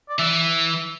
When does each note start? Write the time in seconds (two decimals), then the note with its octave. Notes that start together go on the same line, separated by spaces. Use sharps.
0.09 D5
0.19 E3 E5